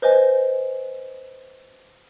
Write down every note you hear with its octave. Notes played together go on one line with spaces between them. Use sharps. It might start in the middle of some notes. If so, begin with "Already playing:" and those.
B4 C5 D#5 G#5